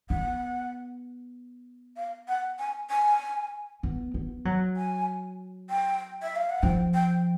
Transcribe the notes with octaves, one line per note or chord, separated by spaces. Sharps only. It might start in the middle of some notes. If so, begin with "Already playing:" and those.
B3 F#5
F5
F#5
G#5
G#5
B3
B3
F#3
G#5
G5
E5
F5
F#5
F3 G5
G5